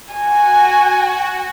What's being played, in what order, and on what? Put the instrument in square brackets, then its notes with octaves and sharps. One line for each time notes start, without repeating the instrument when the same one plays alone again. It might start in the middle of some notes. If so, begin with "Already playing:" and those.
[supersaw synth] F#4 [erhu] G#5